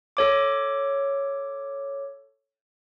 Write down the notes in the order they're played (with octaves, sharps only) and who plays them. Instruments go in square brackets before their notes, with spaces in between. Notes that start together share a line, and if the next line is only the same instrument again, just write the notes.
[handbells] A4 C#5 D6